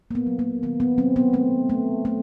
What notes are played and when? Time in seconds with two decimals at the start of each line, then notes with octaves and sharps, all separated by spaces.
0.11 A#3
0.15 B3
0.27 F#3
0.39 A#3
0.63 D#3 B3
0.80 B3
0.98 F#3 C4
1.16 B3
1.33 A3 C4
1.70 A3
2.05 A3